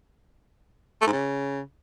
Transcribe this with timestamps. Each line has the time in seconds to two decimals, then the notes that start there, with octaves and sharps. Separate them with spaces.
1.02 A3
1.07 G#2
1.13 C#3